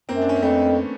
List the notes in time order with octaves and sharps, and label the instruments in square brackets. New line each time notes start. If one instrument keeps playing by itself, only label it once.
[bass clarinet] F#2 [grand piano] A#3 C4
[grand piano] D4
C#4
C4
[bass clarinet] F2 [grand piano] A3 B3